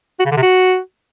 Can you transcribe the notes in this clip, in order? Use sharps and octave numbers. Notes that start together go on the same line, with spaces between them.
F#4
C#3
D3
C3
F#4